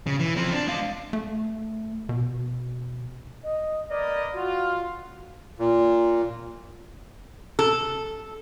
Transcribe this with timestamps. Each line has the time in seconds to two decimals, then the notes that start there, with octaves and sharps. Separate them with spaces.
0.07 C#3
0.19 E3
0.36 F3 C4
0.53 D4
0.67 G#3 F5
1.13 A3
2.09 B2
3.44 D#5
3.90 A#3 B4 D5 D#5
4.33 F4 F#4
5.59 A#2
7.59 A4